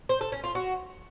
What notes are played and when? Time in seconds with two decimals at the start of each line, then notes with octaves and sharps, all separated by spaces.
0.09 C5
0.21 A4
0.32 C#4
0.44 F4
0.55 F#4